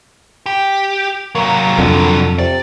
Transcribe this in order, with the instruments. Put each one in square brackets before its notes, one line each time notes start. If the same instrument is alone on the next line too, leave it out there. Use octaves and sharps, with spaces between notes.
[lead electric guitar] G4
[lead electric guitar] C3 F#3 [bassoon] A#3
[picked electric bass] F2 [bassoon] D3
[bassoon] C3 [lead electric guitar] D5